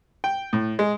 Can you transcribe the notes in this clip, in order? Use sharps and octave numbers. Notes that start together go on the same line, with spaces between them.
G5
A2
G#3